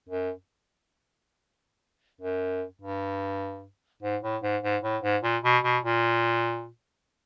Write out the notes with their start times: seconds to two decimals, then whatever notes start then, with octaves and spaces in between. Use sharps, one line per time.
0.09 F#2
2.21 F#2
2.81 G2
4.03 G#2
4.23 A2
4.43 G#2
4.63 G#2
4.83 A2
5.03 G#2
5.23 A#2
5.44 B2
5.64 B2
5.84 A#2